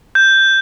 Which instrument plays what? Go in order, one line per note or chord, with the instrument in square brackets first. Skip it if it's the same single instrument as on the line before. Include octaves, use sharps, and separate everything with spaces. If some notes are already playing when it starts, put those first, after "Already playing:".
[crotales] G6